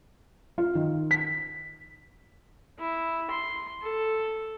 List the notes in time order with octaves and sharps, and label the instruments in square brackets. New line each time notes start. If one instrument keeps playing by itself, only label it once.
[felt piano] F4
D#3
B6
[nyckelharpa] E4
C6
A4